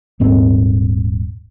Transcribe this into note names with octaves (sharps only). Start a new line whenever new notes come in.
D#1 G#2 C4